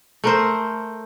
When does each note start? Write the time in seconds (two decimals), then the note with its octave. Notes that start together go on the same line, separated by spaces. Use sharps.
0.24 A3 A#4 C5